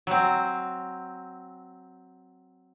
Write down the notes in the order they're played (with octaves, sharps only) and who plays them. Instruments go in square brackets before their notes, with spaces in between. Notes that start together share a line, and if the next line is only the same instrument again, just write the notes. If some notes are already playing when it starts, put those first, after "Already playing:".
[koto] F#3 C4